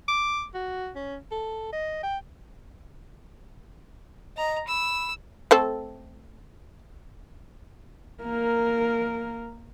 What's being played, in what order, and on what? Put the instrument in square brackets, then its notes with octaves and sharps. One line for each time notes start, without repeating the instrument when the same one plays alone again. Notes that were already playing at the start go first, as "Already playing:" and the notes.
[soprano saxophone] D6
F#4
C#4
A4
D#5
G5
[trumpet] D#5 [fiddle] A#5
[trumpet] B5 [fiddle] E6
[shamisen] A3 C4 A4
[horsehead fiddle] A#3 A#4